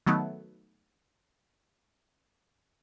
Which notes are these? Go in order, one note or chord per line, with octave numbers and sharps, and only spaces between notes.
D#3 F#3 A3 B3 D#4